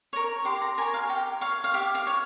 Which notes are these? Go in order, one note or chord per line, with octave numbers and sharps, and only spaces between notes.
A#4 C#5
G4 C6
A#5
A#4 C#5 G#5
F5
G4 G5
C#5 F5
F5
G4 E5
F5
C#5